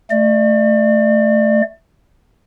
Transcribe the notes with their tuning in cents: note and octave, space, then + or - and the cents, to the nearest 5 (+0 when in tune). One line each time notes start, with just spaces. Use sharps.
A3 +0 D5 +35